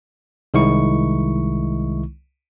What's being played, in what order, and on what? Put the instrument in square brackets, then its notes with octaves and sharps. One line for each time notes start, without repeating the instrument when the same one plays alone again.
[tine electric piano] C2 D#3 G#3 D#4 E4 C#6